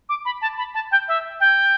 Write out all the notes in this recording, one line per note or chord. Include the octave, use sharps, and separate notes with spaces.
D6
B5
A5
B5
A5
G5
E5
G5